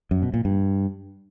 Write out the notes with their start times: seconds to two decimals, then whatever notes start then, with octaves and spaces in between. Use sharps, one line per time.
0.11 F#2
0.22 B2
0.34 A#2
0.45 G2